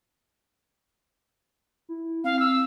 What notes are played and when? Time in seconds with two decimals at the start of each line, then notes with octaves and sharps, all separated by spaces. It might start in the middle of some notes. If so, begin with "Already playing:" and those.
1.89 E4
2.24 C4 F5
2.40 E6